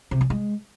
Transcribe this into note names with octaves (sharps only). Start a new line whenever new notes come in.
C3
F3
G#3